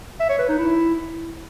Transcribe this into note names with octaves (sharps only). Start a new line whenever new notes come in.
E5
C#5
B4
D#4
E4